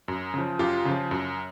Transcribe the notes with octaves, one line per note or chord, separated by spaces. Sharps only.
F#2
C#3 F3
F#2 F4 G4
C#3 F3
F#2